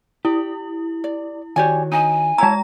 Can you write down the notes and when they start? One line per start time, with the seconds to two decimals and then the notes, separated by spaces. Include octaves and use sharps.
0.25 E4 G4
1.04 D5
1.56 D#3 F#4 G4 C#5 D5 G#5
1.92 D#4 D#5 G#5
2.38 G#3 E4 C#5 A5 A#5